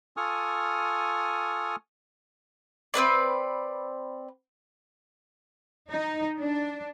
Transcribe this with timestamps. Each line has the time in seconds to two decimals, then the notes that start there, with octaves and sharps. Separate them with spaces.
0.17 F4 A4 G#5 C#6 D#6 F6
2.94 C4 D4 B4 D5
5.89 D#4
6.39 D4